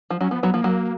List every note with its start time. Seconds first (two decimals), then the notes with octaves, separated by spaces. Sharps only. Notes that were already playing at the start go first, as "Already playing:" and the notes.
0.10 F3
0.21 F#3 C#4
0.31 F3 B3
0.43 F#3 B3
0.54 F3 A#3
0.64 F#3